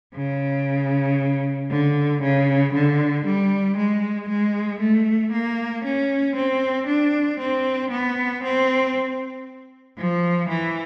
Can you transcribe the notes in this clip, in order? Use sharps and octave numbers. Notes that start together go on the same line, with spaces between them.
C#3
D3
C#3
D3
G3
G#3
G#3
A3
A#3
C#4
C4
D4
C4
B3
C4
F3
E3